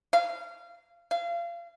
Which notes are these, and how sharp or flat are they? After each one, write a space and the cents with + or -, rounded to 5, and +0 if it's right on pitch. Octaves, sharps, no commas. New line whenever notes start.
F5 -25
F5 -30